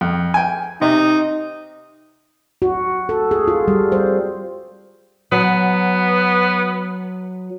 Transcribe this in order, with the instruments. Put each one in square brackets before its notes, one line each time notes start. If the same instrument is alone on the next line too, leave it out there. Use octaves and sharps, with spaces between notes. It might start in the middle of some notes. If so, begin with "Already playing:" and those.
[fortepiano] F2
G5 G#5
[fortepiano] C3 [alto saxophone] D#4
[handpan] F#4
A4
G#4
F4
G3
C5
[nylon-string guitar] F#3 [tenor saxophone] B3